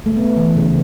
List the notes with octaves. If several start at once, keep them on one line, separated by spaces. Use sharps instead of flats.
A3
B3
E3
C#3